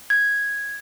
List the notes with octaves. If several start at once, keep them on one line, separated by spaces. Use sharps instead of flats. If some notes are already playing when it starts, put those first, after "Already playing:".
G#6